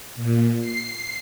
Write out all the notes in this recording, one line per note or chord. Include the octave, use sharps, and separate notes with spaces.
A#2
C7